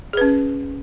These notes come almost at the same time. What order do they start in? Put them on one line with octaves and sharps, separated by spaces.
G#4 B4 C#4